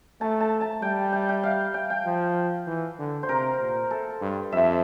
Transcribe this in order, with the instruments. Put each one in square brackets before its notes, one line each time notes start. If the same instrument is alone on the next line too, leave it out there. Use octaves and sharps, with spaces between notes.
[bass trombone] A3 [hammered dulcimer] A5
[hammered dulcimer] A5
A5
[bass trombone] G3 [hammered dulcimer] G5
[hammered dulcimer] G5
G5
F5
G5
G5
[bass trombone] F3
E3
D3
[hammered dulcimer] C5
[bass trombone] C3 [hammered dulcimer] A#4
[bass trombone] A#2
[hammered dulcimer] A4
[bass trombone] G2
[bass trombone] F2 [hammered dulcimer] E5